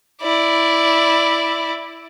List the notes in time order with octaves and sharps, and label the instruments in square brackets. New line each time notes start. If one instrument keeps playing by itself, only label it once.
[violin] E4 D5